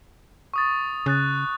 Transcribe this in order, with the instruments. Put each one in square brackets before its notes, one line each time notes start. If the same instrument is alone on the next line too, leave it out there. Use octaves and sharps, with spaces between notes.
[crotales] C#6 D#6 A6
[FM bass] C#3 [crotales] D#6 F#6 A6